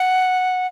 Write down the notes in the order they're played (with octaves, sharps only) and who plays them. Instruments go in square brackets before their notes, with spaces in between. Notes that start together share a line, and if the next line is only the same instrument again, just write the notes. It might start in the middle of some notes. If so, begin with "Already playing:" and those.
Already playing: [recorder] F#5